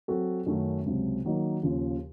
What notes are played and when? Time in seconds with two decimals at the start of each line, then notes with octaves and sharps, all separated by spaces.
0.08 F#3 C4 F#4 A4
0.46 F#2 D#3 A3 C#4 F#4
0.86 C#2 C3 F#3
1.25 D#3 F#3 A#3 D#4
1.63 D#2 C#3 F3